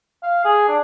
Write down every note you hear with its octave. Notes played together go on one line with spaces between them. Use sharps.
F5
G#4
D4